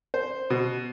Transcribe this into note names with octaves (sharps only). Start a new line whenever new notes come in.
C5
B2